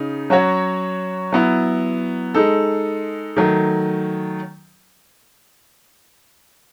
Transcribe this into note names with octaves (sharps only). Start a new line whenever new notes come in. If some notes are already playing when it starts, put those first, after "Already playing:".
Already playing: C#3 D#4
F#3 C#4 F#4 C#5
F#3 B3 E4
G#3 D#4 A4
D#3 F#3 A3